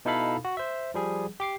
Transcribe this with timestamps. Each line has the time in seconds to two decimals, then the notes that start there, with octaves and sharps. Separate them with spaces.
0.05 B2 D#4 E4 A4 F5 B5
0.45 F#4
0.57 C5 E5
0.94 F3 G3 G#4
1.40 G4 D6 C7